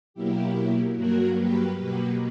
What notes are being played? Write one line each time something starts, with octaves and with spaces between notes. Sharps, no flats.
B2 F#3 A#3 E4 G4
G2 F#3 A#3 F#4 A#4
G4 B4
B2 F#3 A#3 G4 B4